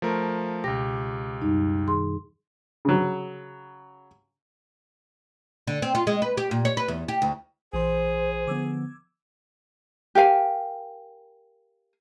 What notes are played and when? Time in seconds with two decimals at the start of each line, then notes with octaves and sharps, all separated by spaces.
0.02 F3 A3 A#4
0.64 C#2 B2 G4 A#6
1.42 F#2 G3 D#4
1.87 D#3 G#4 C6
2.85 C#3 F#3
5.67 D3
5.82 C4
5.95 F4
6.07 G#3
6.22 B4
6.37 G4
6.51 A#2
6.65 C#5
6.77 B4
6.88 E2
7.08 G4
7.22 D2
7.73 A#1 E3 G#4 C5 C6
8.47 D3 F3 B3 D6 E6 G#6
10.15 G4 A#4 F5 G#5